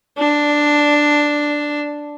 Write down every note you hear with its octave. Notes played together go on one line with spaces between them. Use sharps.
D4